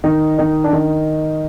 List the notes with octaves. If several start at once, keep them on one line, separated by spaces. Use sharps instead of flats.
D#3 D#4
D#3 D#4
D4
D#3 D#4